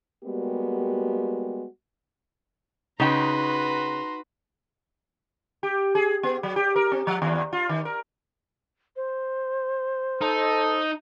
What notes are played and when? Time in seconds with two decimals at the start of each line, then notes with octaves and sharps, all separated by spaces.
0.24 G3 G#3 A#3 B3 F#4 G4
3.00 C#3 D#4 F#4 B4 G5 A#5 C6
5.63 G4
5.95 G#4
6.23 B3
6.43 F#3
6.56 G4
6.76 A#4
6.92 C4
7.07 F3
7.22 D#2
7.53 F4
7.69 D#3
7.85 A#4
8.96 C5
10.21 D#4 A4